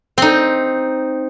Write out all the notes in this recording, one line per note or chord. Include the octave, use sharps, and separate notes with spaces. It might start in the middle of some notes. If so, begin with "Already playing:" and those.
C4 D#4